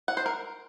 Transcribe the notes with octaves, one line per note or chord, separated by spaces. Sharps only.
F#5
C5
A#4